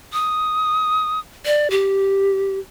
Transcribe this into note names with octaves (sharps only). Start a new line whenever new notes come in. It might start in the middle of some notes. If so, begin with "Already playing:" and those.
D#6
D5
G4